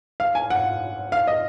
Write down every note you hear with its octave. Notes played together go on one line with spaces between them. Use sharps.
F5
G#5
F#5
F5
D#5